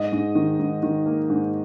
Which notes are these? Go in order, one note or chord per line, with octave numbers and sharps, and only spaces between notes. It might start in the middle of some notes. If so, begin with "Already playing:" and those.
Already playing: G#2 D#5
G#2
D#3
G#2
D#3
A#3
G#2